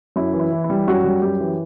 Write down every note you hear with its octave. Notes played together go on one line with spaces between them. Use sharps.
F#2 E4
E3
E4
E3
E4
G3
F#2 F#4
G3
F#2 G4
E3